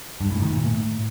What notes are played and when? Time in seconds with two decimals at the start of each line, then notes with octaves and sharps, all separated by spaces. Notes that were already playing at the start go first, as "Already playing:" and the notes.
0.21 G2
0.31 A2
0.42 D#3
0.53 A#2
0.63 A2